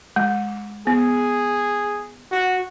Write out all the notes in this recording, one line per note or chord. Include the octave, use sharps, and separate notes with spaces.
G#3
B3 G#4
F#4